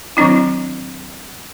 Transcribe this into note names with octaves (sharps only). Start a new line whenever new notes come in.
D#3 F#3 C4 D4 E4